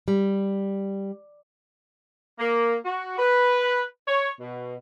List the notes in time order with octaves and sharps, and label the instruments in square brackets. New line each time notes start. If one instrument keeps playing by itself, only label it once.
[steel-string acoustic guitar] G3
[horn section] A#3
F#4
B4
C#5
B2